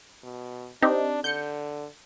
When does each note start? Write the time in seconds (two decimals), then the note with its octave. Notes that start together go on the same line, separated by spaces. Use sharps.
0.24 B2
0.82 C4 D4 D#4 G4
1.24 D3 G6 C#7